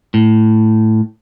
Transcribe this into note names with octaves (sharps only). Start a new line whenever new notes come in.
A2